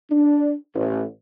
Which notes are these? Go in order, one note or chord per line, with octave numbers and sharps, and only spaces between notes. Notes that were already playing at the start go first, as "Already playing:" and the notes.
D4
A1